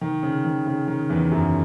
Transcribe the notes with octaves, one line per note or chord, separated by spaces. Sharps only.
D#3
C#3
D#3
C#3
D#3
E2 E3
F#2 F#3